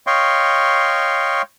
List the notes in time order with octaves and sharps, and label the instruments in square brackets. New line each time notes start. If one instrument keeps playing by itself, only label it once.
[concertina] C#5 D#5 F5 G5 C6 C#6